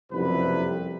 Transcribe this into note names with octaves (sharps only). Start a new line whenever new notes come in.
F#1 C2 F2 C3 B4